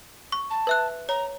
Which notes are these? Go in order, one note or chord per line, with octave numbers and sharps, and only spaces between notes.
C#6
A5
B4 E5 F#6
C#5 A#5